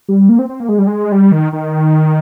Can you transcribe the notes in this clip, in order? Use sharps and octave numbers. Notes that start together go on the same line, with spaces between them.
G3
A#3
C4
C4
A#3
G#3
G3
G#3
G3
D#3
D#3